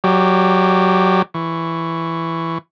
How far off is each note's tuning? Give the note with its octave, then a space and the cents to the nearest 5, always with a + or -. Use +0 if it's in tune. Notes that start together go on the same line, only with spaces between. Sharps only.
F#3 +0 G4 +0 D5 +25
E3 +10 C#6 +0